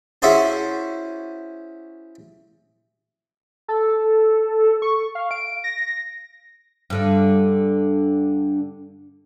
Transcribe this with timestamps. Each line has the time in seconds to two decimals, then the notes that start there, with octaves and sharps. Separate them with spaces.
0.22 C#4 E4 F#4 G#4 C5 A5
3.68 A4
4.82 C#6
5.15 F5
5.31 D7
5.64 A#6
6.90 G2 D3 D4